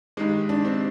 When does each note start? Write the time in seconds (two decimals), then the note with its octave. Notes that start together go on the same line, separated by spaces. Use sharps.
0.17 G2 D#3 G#3
0.49 D4
0.65 C4